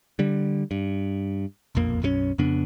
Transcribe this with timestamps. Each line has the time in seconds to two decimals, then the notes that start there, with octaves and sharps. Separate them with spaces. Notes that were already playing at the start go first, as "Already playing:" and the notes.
0.19 D3 G3
0.71 G2
1.75 E1 A#1 F2 A#3
2.02 B1 F#2 F3 C#4
2.38 F2 C#3 B3 D4